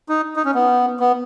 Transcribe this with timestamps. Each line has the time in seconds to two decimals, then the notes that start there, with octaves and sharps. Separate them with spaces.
0.09 D#4
0.36 D#4
0.45 C#4
0.54 B3
1.00 B3